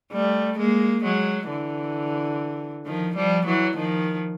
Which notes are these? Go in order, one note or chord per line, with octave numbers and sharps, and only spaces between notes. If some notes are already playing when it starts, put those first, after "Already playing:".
G3 A3
G#3 A#3
F#3 G#3
D3 E3
D#3 F3
F3 G3
E3 F#3
D#3 F3